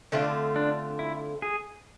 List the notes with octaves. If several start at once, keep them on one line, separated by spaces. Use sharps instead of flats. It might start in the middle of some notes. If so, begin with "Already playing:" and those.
D3 A3 C4 D4 F4
D4
E4
G#4